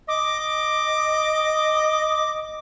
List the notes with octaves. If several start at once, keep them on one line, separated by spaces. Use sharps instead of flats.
D#5 D6